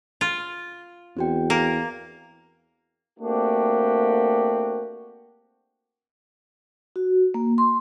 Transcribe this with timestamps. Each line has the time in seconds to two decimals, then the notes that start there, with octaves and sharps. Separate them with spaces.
0.21 F4
1.17 E2 C4 F#4 G5
1.50 A#3
3.19 A3 A#3 C4 D4 F#4 G4
6.96 F#4
7.34 A#3
7.58 C6